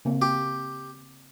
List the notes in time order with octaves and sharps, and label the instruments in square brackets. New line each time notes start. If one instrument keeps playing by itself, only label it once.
[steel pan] C#3 A#3 C4
[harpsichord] G4